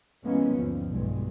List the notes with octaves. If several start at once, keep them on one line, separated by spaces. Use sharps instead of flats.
E3 F#3 G#3 A#3 B3 C#4
G1 D#2 D3 F3
B1 G2 B2 D3 G#3